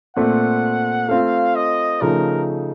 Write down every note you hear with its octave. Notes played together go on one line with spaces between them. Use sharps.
A#2 A3 C4 F#5
A3 C4 F4 F5
D#5
C#3 F3 A3 D#4 A#4